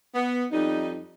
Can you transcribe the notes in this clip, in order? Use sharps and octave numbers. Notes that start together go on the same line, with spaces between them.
B3
F2 G3 D#4